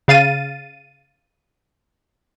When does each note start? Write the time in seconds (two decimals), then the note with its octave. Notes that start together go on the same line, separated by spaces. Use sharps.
0.08 C#3 F5 A6 D#7